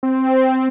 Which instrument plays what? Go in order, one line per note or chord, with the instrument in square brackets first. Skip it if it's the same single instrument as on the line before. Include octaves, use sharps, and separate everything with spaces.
[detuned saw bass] C4